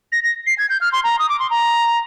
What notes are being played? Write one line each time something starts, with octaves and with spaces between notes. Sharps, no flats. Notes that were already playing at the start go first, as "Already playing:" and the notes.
A#6
A#6
C7
G#6
G6
F6
C6
A#5
D#6
D6
C6
A#5